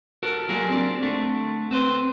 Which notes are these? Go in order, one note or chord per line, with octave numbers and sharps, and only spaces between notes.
F#4 A4 A#4
F#3 G3 A#3 F4 G#4
C4 D4
D2 D3 A3
C4 B4 C5